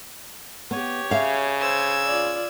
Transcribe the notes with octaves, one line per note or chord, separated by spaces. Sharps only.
B3 G4 C#5
C#3 E5 F5
C5 E6 G#6
F4 D5